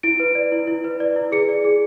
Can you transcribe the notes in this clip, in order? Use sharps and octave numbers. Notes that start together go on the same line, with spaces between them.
E4 D7
B4
D5
E4
E4
B4
D5
E4
G#4 C#7
D5
G#4